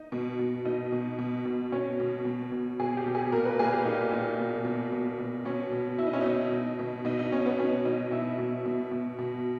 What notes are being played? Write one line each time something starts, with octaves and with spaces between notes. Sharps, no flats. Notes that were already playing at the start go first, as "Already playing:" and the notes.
Already playing: D#4
B2
B2
B2 D#4
B2
B2
B2
B2 C#4
B2
B2
B2
B2 G#4
G4
B2
G#4
A#2 A#4
B4
A#2 G#4
G4
A#2 D#4
A#2
B2
B2
B2
B2
B2 C#4
B2
B2 E4
D#4
C#4
B2 D#4
B2
B2
B2 D#4
D#4
B2 C#4
B3
B2 C#4
B2 D#4
B2 E4
B2
B2
B2
B2